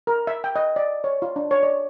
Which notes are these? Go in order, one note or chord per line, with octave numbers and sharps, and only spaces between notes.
A#4
E5
G5
D#5
D5
C#5
F4
D4
C#5
D5